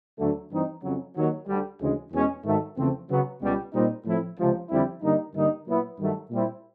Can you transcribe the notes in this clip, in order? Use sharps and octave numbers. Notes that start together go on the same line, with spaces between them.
D2 D3 F#3 A3
G2 E3 G3 C4 D#4
F2 C#3 F#3
D#2 D#3 F#3
D2 D3 G3
D2 C#3 E3 G#3
E2 B2 G#3 C#4
G#2 D#3 F#3 A3
E2 C#3 F3 A3 C4
C#3 F#3 B3
C#2 B2 G3
A#2 G3 C4 D#4
A2 F3 A3 C4 E4
C#2 C3 F3
F2 D3 G3 C4 E4
G2 D3 G3 A#3 D#4
G2 D3 G3 A#3 D#4
A#2 F#3 B3 E4
G2 D#3 F#3 A3
A#2 G3 C4 E4